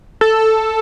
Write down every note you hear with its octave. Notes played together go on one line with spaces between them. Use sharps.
A4